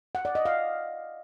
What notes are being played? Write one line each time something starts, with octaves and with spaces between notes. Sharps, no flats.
F#5
D5
D#5
F5